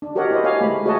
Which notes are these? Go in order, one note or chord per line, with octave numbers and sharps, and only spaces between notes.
D4
F#4 G4 A#4 C#5 D#5 F#5
E4 C5 D#5
G4 C#5 D#5 F5 G#5
G#3 A3 B5
F#4 G#4 C#5 D#5 F#5 A5